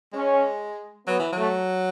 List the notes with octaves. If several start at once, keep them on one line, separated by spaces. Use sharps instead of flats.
G#3 C#4
F#3 B3
E3
F#3
A3